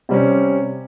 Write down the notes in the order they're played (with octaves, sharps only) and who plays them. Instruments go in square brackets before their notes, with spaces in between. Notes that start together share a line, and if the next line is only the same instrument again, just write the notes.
[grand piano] C3 G3 C#4